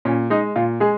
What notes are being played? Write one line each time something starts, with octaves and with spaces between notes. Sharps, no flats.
A#2 C#4
G#3 D#4
A#2 F4
G#3 G#4